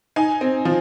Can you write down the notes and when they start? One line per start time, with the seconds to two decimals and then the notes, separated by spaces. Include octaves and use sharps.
0.16 D#4 G#5
0.41 C4
0.65 F3